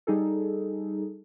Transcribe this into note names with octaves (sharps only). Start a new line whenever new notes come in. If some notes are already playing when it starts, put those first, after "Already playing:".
G3 D#4 G#4 A4